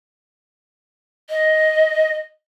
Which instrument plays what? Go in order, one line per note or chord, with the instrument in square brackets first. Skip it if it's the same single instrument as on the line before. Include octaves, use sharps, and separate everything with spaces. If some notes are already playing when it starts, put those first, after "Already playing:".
[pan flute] D#5